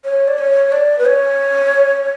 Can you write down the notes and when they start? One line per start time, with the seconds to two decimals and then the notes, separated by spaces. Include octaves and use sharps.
0.05 C#5
0.28 D5
0.38 C#5
0.72 D5
0.99 B4
1.05 C#5